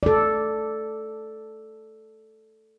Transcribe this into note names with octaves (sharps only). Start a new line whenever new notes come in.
A4 D5